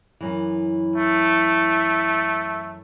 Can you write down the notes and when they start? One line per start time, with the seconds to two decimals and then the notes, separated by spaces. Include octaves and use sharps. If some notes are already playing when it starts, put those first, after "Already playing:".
0.21 F#2 E3
0.96 A3